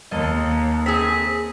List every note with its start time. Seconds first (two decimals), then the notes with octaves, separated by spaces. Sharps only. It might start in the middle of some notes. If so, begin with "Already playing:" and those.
0.11 D#2 A#3 A4 D#5
0.86 C4 G#4 B6